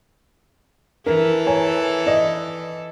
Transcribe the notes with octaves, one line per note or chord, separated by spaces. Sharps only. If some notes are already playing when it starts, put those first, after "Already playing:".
E3 A4 A#4
C#5 G#5 A#5
D5 D#5